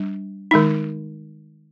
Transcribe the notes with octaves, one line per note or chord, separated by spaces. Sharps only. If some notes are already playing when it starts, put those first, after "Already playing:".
Already playing: G3 D4
D#3 G#3 D#4